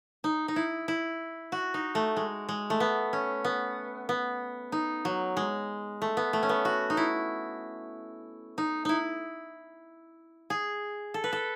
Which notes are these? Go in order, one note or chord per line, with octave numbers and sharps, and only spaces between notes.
D#4
D#4
E4
E4
F#4
D#4
A3
G#3
G#3
A3
B3
C#4
B3
B3
D#4
F#3
G#3
A3
B3
A3
C#4
B3
F#4
D#4
E4
D#4
D#4 E4
G#4
A4
B4
A4